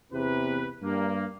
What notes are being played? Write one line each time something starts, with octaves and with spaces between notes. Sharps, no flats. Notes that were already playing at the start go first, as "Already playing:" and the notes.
E2 C3 B4
G2 A#3